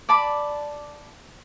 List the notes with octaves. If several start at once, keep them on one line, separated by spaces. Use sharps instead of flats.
D5 A5 B5